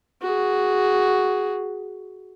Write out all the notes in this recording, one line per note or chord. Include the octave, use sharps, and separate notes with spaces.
F#4 G#4